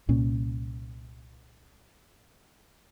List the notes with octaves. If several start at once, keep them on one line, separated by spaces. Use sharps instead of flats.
C2 A#2 C#4